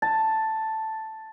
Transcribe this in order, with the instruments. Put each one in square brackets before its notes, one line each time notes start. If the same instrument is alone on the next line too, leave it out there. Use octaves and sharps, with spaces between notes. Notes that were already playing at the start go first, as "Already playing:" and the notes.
[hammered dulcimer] A5